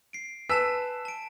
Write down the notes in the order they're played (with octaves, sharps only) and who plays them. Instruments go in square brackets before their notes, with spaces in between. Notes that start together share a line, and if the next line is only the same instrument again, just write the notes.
[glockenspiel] C7 D7
[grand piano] B4 E6 B6 [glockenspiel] G#5 A5 E7
[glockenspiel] A5 D7